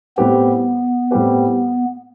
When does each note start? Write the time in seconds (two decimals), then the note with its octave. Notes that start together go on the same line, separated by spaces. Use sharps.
0.17 A2 G3 B3 C4 G4 B4
1.11 A2 G3 C4 G4 B4